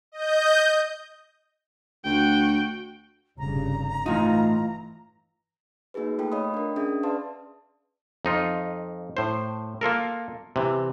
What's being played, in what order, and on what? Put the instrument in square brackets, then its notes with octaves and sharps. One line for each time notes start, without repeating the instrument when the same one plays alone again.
[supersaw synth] D#5 G6
[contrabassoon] D2 [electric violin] F#4 G5
[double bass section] F1 G2 C#3 [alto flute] A#5
[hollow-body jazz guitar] A2 D#4 [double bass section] E3 [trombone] F4
[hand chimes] A#3 D#4 F#4 G#4 B4
A3 F4 A4 G5
C#5 D#5 F5 G5 B5 D#6
D4 A#4
C#4 D4 G#4 E5 D#6
B4 D5 F5 A5 C6
[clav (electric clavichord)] F2 D#4 F4
A2 C5
A#3 F4 A4 A#4
C3 E3